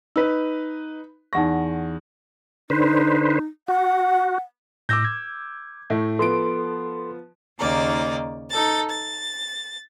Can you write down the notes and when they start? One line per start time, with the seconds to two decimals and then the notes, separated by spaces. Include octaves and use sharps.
0.16 D#4 B4 E6 B6
1.33 E2 D#4 F#5 C#6 A#6
2.70 D3 D#4 B4 C5
3.68 F#4 F#5
4.89 A2 D6 E6 G6 A#6
5.05 G#6
5.90 A2 A3
6.19 F3 B3 A4 C6 D7
7.58 D#2 C#3 A#3 D#4 D5
8.50 D#4 A4 A6
8.89 A6